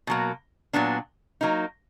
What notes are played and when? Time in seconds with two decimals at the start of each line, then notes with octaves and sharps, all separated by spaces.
0.07 B2 F#3 A#3
0.73 A#2 F#3 B3 D4
1.41 F#3 A#3 D#4